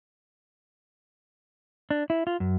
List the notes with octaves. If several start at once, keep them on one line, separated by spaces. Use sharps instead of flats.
D4
E4
F4
F#2